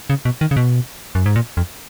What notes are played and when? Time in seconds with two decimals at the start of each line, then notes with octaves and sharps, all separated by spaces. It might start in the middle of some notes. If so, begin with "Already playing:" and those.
0.10 C#3
0.25 B2
0.41 D#3
0.51 C#3
0.57 B2
1.15 F#2
1.26 G#2
1.36 A#2
1.57 F2